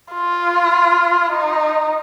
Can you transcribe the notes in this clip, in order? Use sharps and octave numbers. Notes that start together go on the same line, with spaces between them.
F4
D#4